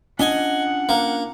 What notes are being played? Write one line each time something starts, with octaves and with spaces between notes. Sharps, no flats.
C#4 D4 F4 D#5 F#5 G#5
A#3